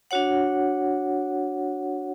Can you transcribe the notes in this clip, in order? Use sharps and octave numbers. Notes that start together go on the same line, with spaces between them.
D4 F#4 C#5 F#5